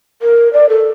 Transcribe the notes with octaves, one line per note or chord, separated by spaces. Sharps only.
A#4
D5
A4